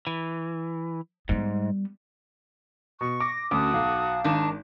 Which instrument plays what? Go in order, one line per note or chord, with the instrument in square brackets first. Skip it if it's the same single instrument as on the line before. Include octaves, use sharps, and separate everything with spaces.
[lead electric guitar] E3
[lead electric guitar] G#2 [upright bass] G3 B3
[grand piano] B2 [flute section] C#6
[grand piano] D6 [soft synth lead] A#6
[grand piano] D2 D6 [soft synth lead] C#4 [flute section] F#4 A5 D#6
[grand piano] B1 [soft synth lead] F5
[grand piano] G#1 [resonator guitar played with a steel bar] D#3 D4